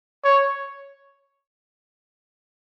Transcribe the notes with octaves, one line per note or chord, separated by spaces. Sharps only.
C#5